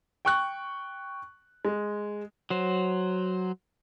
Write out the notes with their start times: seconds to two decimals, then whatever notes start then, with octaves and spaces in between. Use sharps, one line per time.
0.25 G5 C#6 F#6
1.65 G#3
2.50 F#3 C5